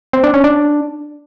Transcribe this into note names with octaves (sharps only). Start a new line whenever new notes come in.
C4
D4
C#4
D4